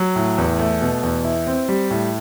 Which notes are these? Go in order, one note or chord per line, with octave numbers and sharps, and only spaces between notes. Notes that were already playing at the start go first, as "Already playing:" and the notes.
Already playing: F#3
A2
E2
A3
B2
E2
E4
C4
G3
A2